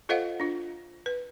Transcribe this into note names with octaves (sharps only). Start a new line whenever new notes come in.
F4 A4 C5 D#5 F5 F#5
D4 F4
B4